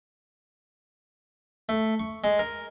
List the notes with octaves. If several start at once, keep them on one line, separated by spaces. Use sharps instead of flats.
A3
C#6
G#3
A#4